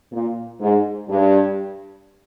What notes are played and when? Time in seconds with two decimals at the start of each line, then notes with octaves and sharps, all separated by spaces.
0.12 A#2
0.61 G#2
1.09 G2